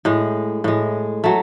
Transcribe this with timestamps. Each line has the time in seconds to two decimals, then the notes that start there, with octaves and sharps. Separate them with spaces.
0.05 A2 G#3
0.64 A2 G#3
1.24 F#3 A3